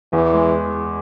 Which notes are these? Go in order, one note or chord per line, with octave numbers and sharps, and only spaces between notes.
E2 E3
G#3